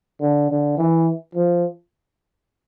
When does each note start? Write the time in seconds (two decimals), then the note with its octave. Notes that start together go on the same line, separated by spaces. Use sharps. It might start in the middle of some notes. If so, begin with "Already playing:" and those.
0.21 D3
0.50 D3
0.77 E3
1.35 F3